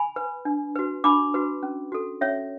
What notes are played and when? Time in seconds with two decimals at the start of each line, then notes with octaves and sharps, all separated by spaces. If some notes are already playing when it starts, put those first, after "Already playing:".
Already playing: G#5 B5
0.16 B4
0.45 D4
0.75 F#4 B4
1.04 D4 B5 D6
1.34 F#4 B4
1.63 C#4
1.92 F#4 A4
2.21 C#4 C#5 E5